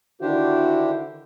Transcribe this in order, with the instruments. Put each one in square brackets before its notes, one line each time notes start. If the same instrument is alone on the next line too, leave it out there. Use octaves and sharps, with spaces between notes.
[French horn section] D3 D#3 E4 [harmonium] D4 G4 C5 [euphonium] F#4